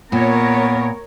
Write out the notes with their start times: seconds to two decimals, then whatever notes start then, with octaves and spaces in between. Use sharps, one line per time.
0.12 A#2 B3 A#4 C#5